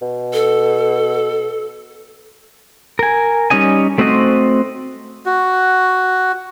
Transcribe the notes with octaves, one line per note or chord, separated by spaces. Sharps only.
B2
A4
A#4 G#5
G3 C#4 D#4 D#5 G#5
A3 C4 F#4 C5 D#5
F#4